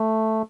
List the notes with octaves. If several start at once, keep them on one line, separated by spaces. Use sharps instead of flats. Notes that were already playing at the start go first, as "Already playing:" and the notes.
Already playing: A3